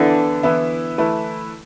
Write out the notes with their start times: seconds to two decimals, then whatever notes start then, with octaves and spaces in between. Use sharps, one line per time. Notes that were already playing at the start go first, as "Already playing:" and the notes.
Already playing: D3 E3 B3 E4
0.43 E3 B3 E4
0.98 E3 A3 E4 B4